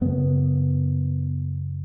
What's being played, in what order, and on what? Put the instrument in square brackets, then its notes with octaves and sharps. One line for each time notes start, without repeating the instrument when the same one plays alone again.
[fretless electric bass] F#2 C#3 B3